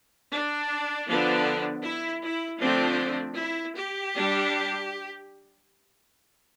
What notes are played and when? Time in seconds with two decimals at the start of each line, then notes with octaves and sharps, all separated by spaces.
0.31 D4
1.07 D3 F3 B3 D4
1.84 E4
2.22 E4
2.60 D3 F3 A3 C4 D4
3.38 E4
3.75 G4
4.13 G3 D4